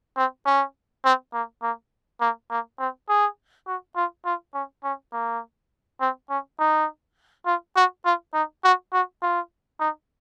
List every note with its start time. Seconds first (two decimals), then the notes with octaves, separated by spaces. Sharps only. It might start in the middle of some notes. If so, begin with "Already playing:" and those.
0.17 C4
0.46 C#4
1.04 C4
1.34 A#3
1.63 A#3
2.21 A#3
2.51 A#3
2.80 C4
3.09 G#4
3.67 F#4
3.96 F4
4.25 F4
4.54 C#4
4.84 C#4
5.13 A#3
6.01 C4
6.30 C#4
6.59 D#4
7.46 F4
7.76 F#4
8.05 F4
8.34 D#4
8.64 F#4
8.93 F#4
9.22 F4
9.80 D#4